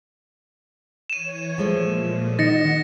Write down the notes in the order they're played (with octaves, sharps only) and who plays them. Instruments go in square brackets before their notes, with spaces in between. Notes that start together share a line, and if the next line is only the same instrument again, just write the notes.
[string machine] E3 C#5 [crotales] D#7 E7
[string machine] A#2 [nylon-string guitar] F3 G#3 A3
[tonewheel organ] D#3 D#4 [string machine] F#5 [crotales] A6 A#6 C#7